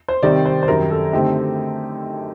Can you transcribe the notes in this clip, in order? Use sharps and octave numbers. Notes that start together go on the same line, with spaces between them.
C5
C3 D#3 G3 C4 D#4 D5
C5
C5
F#2 D#3 G3 A#4
A4
D3 A3 C4 D#4 G4